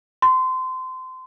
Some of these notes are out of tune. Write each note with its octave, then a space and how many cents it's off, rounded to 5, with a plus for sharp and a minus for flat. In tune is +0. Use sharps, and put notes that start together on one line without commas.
C6 -25